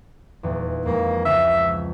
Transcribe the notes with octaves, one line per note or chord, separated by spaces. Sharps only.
D#1 E2
F2 G#3 A#3
C#2 E5